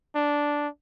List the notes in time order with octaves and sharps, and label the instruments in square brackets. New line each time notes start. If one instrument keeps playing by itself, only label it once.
[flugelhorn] D4